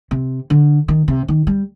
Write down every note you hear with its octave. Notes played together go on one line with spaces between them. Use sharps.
C3
D3
D#3
C3
D#3
G3